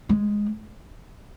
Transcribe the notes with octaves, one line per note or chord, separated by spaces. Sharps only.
G#3